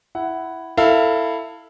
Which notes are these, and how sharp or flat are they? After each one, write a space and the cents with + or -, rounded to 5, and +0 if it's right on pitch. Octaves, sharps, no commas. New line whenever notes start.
E4 +0 F#5 +10
E4 +0 A4 +25 F5 +0